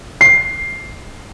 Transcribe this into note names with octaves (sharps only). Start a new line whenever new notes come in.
C7